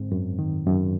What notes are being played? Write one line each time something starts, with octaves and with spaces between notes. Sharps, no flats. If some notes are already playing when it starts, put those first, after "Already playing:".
Already playing: G#2 C4
F#2
D#3
F#2